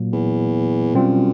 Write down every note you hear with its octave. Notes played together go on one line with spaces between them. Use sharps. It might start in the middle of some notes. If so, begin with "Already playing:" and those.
Already playing: A#2 F#3 A#3
E2
F#2 B2 G3 C4 F4